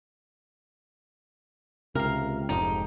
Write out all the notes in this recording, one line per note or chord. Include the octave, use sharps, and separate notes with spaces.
C#2 C3 A#4 F5
F1 F2 G#2 D#4 G4